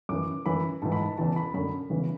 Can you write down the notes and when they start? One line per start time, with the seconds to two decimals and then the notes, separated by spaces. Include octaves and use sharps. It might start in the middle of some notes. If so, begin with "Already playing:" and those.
0.09 F#2 E3 D6
0.46 F#2 E3 B5
0.82 G#2 E3 A5
0.92 B5
1.02 A5
1.18 E2 C#3 E3 A5
1.36 B5
1.54 F#2 D3 B5
1.90 E2 C#3 E3